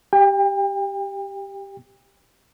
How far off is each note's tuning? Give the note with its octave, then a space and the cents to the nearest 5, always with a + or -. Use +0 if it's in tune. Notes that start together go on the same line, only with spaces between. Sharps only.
G4 +0 G5 +35